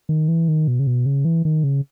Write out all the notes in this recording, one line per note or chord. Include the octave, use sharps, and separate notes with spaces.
D#3
E3
D#3
B2
C#3
B2
C#3
E3
D#3
C#3